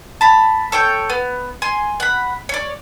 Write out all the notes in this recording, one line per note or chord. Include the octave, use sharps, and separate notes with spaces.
A5 B5
A4 C#5 G5
B3
G#5 C6
F#5 B5
C#5 D5